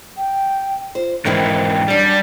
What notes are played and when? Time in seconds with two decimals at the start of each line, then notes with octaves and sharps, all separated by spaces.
0.17 G5
0.95 F4 C5
1.25 G#2 D#3 E3 C4 E4 G5
1.88 F#2 G3 D4